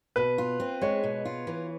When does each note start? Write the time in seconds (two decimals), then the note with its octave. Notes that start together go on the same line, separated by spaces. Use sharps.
0.16 B2 B4
0.38 F4
0.60 C4
0.82 G#3 C#5
1.03 B2
1.25 F4
1.47 E3